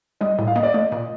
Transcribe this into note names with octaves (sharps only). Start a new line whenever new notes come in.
G3 D#5
A2
F5
A#3 D#5
D5
A3 D#5
A#2